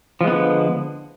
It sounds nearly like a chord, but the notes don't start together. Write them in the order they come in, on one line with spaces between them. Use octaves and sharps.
F3 G#3 B3 D3